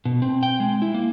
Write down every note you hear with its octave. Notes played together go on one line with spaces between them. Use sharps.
B2
C4
G5
G#3
E4
A#3